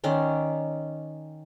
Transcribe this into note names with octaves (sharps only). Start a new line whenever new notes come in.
D#3 C#4 D5 C6